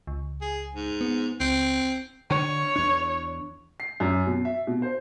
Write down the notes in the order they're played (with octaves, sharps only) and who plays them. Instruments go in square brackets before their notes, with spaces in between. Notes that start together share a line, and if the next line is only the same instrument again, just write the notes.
[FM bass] C#2
[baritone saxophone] G#4
G#2
[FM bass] B3
[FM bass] C#2 [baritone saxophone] C4
[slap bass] D3 [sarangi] C#5
[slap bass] E2 D4
[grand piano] C7
F#2
B2
E5
B2
C5